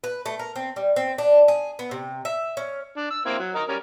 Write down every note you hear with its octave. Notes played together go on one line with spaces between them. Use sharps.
B4
A3
A#4
C4
G3
C4
D4
G#4
B3
C3
E5
C#4
D4
E6
A#3 C4 E4
F#3
A#4 D#5
G3 C#4 A#4